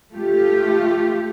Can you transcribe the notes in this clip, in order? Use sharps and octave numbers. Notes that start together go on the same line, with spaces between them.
A3 F4 G4